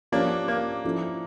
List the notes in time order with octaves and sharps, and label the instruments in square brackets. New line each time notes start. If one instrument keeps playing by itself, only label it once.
[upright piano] F3 C#4 G4 C#5 [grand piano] A#3 D4
[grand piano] A#3
[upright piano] F3 C#4 E4 A4